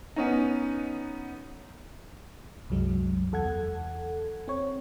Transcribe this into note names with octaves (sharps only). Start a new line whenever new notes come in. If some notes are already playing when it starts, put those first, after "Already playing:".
B3 C#4 D#4
C2 F#2 F#3 G#3
E2 A4 F#5 G#6
C4 C#5